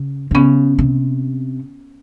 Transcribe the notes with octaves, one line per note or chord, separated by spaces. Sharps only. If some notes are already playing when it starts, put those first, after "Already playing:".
Already playing: C#3
D3
C#3 B3 C#4
C3